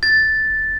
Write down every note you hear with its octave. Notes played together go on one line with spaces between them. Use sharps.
A6